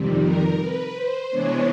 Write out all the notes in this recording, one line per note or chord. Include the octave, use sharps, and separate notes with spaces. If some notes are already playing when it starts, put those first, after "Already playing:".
Already playing: F2 C3 D#3 G3
A#4
B4
C5
C3 E3 G#3 B3 D4 C#5